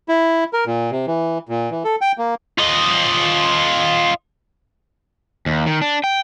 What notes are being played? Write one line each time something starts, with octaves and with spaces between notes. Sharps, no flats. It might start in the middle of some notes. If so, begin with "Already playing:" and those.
E4
A#4
A#2
C3
E3
A#2
E3
A4
G5
A#3
F4 D#5
D#2
D#3
D4
G5